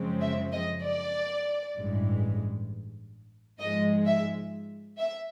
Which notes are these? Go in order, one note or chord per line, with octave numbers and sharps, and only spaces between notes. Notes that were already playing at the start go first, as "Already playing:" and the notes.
Already playing: F#2 C#3 F3 G#3 C4
E5
D#5
D5
A1 G2 E3 G#3
G#2 F3 G#3 D#5
E5
E5